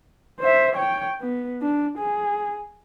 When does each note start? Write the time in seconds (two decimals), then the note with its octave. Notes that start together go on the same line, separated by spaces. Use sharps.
0.40 C5 E5
0.75 C#5 G5
1.21 B3
1.62 D4
1.98 G#4